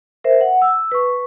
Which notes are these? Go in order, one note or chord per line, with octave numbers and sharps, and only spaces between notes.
A#4 C5 E5
F#5
E6
B4 C#6